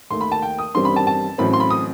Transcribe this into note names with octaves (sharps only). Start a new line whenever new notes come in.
D#2 D#3 A3 C6
B5
A5
G5
D#6
A1 G2 D#3 G3 C4 C6
B5
A5
A5
A1 A2 F#3 C4 B5
C6
B5
D#6